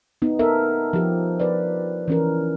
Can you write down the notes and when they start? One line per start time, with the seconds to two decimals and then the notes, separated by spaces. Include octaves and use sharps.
0.22 B3 D#4
0.39 B3 A4 A#4 E5
0.93 F3 G4
1.40 B4 D5
2.08 E3 C#4 A#4